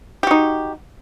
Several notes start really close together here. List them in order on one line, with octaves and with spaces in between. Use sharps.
G4 F#4 D#4